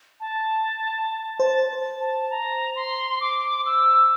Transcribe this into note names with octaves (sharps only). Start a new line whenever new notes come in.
A5
C5 A5
A5
A#5
C6
D6
E6